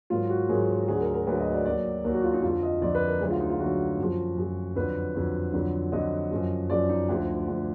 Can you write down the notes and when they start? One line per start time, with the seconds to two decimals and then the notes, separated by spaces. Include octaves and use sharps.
0.10 G#2 D#3 F#3 F4
0.30 F#4
0.49 G#2 D#3 F#3 G#4
0.69 A#4
0.88 D2 D3 F#3 G#4
1.01 A#4
1.14 A#4
1.27 D2 D3 F#3 B4
1.40 D#5
1.53 D5
1.65 D#2 D#3 F#3 D5
2.04 D#2 D#3 F#3 A#4
2.14 F#4
2.24 F4
2.34 D#4
2.42 F2 D3 F3 F4
2.63 D#5
2.82 F2 D3 F3 D5
2.95 B4
3.08 A#4
3.20 D2 D3 F#3 G#4
3.30 F4
3.40 D#4
3.50 F4
3.59 D2 D3 F#3 F#4
3.99 F#2 F3
4.37 F#2 F3
4.76 F2 D3 F#3 B4
5.15 F2 D3 F#3
5.53 F2 D3 F#3
5.92 F2 D3 F#3 D#5
6.31 F#2 F3
6.70 F#2 F3 D5
6.89 D#4
7.09 D2 D3 F3
7.48 D2 D3 F3